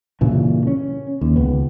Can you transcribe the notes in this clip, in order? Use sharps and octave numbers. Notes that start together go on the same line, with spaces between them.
G2 A#2 C#3 E3
C#4
D#2
C#2 B3